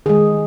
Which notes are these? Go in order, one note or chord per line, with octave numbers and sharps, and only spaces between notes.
D#3 G#3 G#4